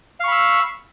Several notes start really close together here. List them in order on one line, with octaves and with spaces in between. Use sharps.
F5 C#6 B5 E6